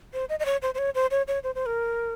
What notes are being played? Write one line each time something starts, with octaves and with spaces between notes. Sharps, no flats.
C5
D#5
D#5
C#5
C5
C5
C#5
C5
C#5
C#5
C5
C5
A#4